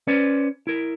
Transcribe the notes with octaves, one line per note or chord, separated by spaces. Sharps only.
C#4 B4 C5 D5
E4 A#4